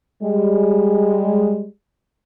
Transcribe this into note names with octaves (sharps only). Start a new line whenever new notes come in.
G3 G#3